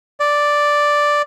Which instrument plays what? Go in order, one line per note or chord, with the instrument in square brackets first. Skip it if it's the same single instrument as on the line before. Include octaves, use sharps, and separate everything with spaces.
[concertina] D5